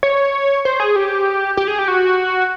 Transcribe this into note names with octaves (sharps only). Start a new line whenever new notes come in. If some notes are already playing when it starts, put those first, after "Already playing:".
C#5
C5
G#4
G4
G4
G#4
G4
F#4